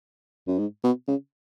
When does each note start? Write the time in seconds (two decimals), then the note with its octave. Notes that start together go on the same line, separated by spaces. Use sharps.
0.48 F#2
0.59 G#2
0.84 B2
1.08 C#3